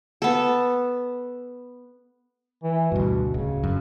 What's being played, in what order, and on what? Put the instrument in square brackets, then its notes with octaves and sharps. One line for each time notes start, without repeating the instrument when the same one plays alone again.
[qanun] B3 A4
[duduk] E3
[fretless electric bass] D2 G2 [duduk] B2
[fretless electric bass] D1 [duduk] C#3
[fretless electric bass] F#2